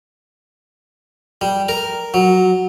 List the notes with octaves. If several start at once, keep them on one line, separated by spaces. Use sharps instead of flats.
G3
A#4
F#3